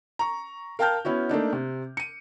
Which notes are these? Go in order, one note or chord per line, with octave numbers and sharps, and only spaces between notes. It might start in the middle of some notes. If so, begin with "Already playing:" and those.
A#5 C#6
A#4 F5 G5 A5 F6 G6
B3 C#4 E4 F#4
A3 A#3 D4 D#4
C3
C#7 D#7